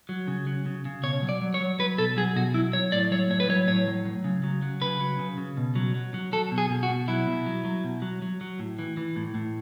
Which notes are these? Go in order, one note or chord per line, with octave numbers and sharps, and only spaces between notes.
F#3
C#3
F#3
C#3
C#3
B2 C#5
F#3
D5
F#3
C#5
F#3
F#3 B4
B2 A4
F#3 G#4
B2 F#4
F#3 E4
F#3 C#5
A2 D5
F#3 C#5
A2 C#5
B4
F#3 C#5
A2 C#5
F#3
F#3
C#3
F#3
F#3
C#3 B4
F#3
C#3
C#3
B2
F#3
F#3
F#3
F#3 A4
B2
G#4
B2
F#4
B2
F#3 E4
B2
F#3
F#3
B2
F#3
F#3
F#3
A2
E3
E3
A2
A2